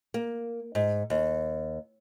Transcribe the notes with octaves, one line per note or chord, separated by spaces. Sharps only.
A#3
G#2
D#2